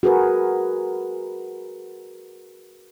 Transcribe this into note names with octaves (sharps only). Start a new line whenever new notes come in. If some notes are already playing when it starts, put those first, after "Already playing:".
F#4 G#4 A#4 B4